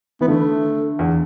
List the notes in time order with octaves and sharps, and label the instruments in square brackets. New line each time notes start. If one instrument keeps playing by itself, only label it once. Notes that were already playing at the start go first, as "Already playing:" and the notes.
[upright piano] E3 [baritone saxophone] B3
[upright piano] D3 [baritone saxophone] A3
[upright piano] E2